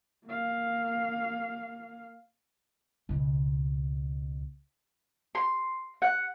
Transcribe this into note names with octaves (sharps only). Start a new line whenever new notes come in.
A#3 F5
C#2 B2
C6
F#5